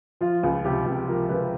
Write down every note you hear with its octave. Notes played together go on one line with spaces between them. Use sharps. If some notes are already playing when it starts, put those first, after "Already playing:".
F3 F4
C#2
C3 G4
C#2
F3 A#4
C#2 B4